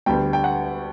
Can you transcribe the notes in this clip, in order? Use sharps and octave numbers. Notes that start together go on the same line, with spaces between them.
D2 D3 G3 B3 G5
G5
F#5